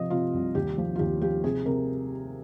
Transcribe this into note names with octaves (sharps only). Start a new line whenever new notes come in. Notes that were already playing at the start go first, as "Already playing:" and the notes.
Already playing: C3 F3 D#5
C3 F4
C2
D#2 G4
F3
F4
D#2 G4
F3 G4
C3 G#4
C3 A#4